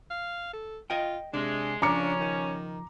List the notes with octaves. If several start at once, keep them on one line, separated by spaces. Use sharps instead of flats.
F5
A4
F4 D#5 G5
C3 G#3 D4
C#3 F3 C#4 D4 A#5 D6 C#7
D#3